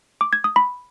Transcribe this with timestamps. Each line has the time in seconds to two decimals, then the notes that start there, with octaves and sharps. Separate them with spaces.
0.21 D6
0.33 G#6
0.44 D#6
0.56 B5